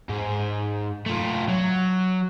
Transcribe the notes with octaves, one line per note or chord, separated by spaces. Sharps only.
G#2
A3 F4
F#3